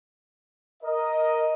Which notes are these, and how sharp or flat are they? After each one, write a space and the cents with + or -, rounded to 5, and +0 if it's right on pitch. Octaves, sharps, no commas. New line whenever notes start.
A#4 +0 D#5 +0